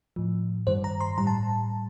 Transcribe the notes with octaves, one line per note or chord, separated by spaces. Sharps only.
A2 F3
G2 D#3 G3 C5
A#5
C6
A2 G3 A#5
A5